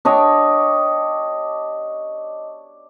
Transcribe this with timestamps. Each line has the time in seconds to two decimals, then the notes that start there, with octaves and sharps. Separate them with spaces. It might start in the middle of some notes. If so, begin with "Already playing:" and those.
0.05 D4 G4 C#5 D#5